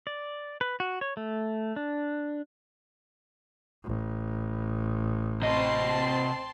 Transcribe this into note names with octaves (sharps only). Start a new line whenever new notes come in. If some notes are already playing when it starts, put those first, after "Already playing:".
D5
B4
F#4
C#5
A3
D4
A1
C3 C4 D#5 A5 C6